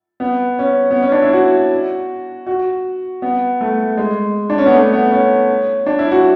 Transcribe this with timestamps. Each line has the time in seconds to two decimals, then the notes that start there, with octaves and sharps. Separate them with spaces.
0.20 B3
0.59 C#4
0.91 B3
1.02 C#4
1.12 D4
1.22 E4
1.33 F#4
2.47 F#4
3.22 B3
3.61 A3
3.97 G#3
4.50 D4
4.58 C#4
4.66 B3
4.73 A3
4.93 B3
5.11 C#4
5.86 D4
5.99 E4
6.12 F#4